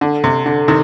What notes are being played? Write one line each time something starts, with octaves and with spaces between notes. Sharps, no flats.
D3
C3
D3
C3 D#3